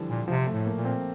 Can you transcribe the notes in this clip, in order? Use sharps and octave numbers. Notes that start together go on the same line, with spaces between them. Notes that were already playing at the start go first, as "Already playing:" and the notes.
Already playing: D3 E3 F3 G3
A#2
C3 F3
A3
A2
A#3
A#2
C4